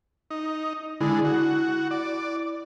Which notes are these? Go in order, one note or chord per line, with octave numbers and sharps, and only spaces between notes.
D#4
D3 G#3 E4
F#4
D5